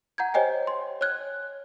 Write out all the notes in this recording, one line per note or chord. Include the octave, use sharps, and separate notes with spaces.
F#5 A#5 G6 G#6
G4 C5 C#5 D#5 G5 G#5
C6
C#5 F6 F#6 G#6